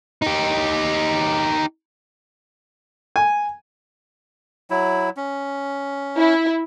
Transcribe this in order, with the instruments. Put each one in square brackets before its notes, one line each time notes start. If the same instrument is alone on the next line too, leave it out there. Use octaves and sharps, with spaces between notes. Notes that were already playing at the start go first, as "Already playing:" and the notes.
[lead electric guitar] D#4 G4
[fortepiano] G#5
[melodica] F#3 E4
C#4
[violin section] E4